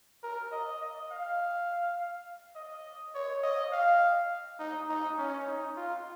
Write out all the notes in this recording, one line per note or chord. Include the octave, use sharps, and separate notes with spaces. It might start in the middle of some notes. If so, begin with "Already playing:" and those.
A#4
D#5
D#5
F5
D#5
C#5
D#5
F5
D#4
D#4
C#4
D#4
F4